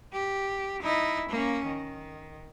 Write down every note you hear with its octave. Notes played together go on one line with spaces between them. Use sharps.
G4
D#4 E4
A#3 C#4
D#3